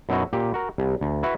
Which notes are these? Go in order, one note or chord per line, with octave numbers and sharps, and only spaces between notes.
F#2 B2 D#4 E4 F#4
A#2 G4
F#4 A#4
C2
D2
E4 F#4 B4 E5